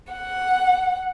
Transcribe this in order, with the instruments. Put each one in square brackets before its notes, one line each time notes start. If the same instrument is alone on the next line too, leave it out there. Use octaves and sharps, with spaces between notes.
[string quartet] F#5